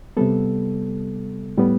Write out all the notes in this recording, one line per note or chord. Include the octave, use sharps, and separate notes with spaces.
C3 G3 B3 A4
A2 G3 B3